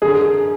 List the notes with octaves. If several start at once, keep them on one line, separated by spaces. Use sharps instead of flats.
F#2 D3 G#4